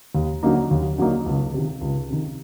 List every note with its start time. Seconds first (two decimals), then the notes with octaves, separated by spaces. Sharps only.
0.15 D#2
0.43 D3 F#3 A#3 D#4
0.71 D#2
0.98 D3 F#3 A#3 D#4
1.26 C#2
1.54 C3 D#3
1.81 C#2
2.10 C3 D#3